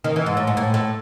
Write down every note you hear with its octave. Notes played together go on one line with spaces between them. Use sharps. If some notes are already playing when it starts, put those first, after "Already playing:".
D#3
E3
G#2
A2
G#2
A2
A2